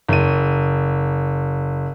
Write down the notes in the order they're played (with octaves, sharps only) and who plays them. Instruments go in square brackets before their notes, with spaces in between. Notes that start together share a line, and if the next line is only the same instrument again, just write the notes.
[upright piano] F#1 D#7